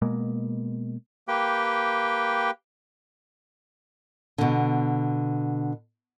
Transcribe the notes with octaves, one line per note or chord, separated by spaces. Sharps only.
B2 G#3 A#3
A#3 G4 B4 G5
B2 D3